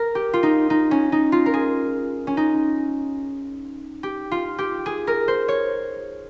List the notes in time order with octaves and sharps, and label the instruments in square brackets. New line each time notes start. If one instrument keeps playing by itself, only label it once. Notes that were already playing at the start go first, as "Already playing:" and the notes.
Already playing: [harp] A#4
G4
F4
D#4
D#4
C#4
D#4
F4
A#4
G#4
C#4
D#4
G4
F4
G4
G#4
A#4
C5
C#5